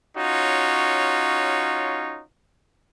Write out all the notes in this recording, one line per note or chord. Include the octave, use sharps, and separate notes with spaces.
C#4 D#4 F4 F#4 C#5